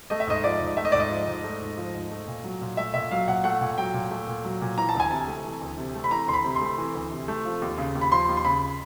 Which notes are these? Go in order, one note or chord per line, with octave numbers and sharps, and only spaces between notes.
A3 D#5
E5
G#2 D#5
F3 D5
G#2
A3 E5
D#5
G#2 D5
D#5
F3
G#2
A3
G#2
F3
G#2
A3
A#2
F#3
A#2
A3 E5
A#2 E5
F#3 F5
A#2 F#5
A3 F#5
A#2
F#3 G5
A#2
A3
A#2
F#3
A#2
E3 A#5
A5
D2 G#5
C3 A5
A3
E3
D2
C3
A3
B5
E3 A#5
D2 C6
B5
C3
C6
A3
E3
D2
C3
A3
F3
D#2
C#3
D#2
B5
F3 C6
D#2
C6
C#3 B5